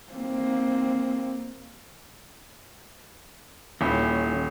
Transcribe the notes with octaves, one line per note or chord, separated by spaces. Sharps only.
A#3 C4
D#1 D#2 C#4 E4